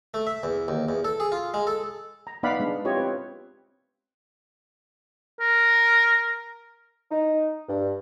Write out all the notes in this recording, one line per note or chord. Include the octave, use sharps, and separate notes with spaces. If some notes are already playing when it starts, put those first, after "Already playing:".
A3
E5
E2
D#2
E2
A4
G#4
F4
G#3
A4
A#5
B3 D#4 D5 F5 F#5 B5
G#3 B3 D4
C4 E4 F4 G4 C#5 D#5
C4 B4
A#4
D#4
G2